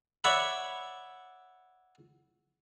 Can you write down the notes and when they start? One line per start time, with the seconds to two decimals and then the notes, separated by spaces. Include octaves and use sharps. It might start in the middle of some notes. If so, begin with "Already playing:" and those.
0.24 C#5 D5 E5 F#5 B5